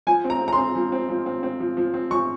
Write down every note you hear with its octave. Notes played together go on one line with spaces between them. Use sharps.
F3 G#5
C4
A#5
C4
A#5
C6
C4
F3
C4
F3
C4
C4
F3
F3
C4
F3 C#6